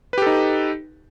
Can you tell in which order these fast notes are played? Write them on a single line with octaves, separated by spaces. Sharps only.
B4 G4 A4 D#4